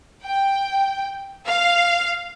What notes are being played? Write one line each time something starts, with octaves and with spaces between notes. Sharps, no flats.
G5
F5